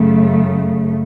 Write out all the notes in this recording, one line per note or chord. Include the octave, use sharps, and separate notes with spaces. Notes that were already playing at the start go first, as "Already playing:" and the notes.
Already playing: F#2 C#3 A3